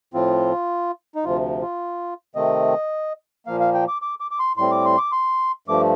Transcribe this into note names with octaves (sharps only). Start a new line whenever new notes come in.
A2 F3 C4 F4
D#4
D2 C3 F3 F4
F4
C3 D#3 A3 C4 D#5
A#2 F3 A#3 F5
F5
G5
D6
D6
D6
D6
C6
A2 G3 C4 C6
D6
C6
D6
C6
G2 F3 A3 D6